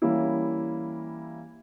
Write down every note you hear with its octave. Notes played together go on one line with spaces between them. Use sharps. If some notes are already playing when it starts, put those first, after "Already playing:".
E3 G3 A#3 C#4 E4